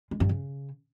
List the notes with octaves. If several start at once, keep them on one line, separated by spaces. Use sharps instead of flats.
G#3
G2
C#3